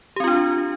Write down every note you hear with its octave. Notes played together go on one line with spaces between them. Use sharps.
C4 D4 F4 G4